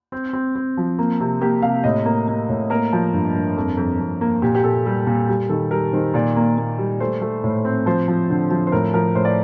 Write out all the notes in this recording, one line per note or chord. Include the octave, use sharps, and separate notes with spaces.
C4
C4
C4
F3
A#3
C3
A#3 G4
C3 F5
A2 D#5
A#3
A#3
A2
A#3 A#4
F3
G2
G2
F2
F2
F2
A#3
A#2 G4
G4
A#2 A4
G3
A#2
G3
D#3 A4
G3 A#4
D#3 C5
A#2 D5
A#3
A#3
G3
A3 C5
A3
A2
C4
F3 C5
F3
D3
F3
C5
A2 A#4
F3 A#4
A2 C5
D5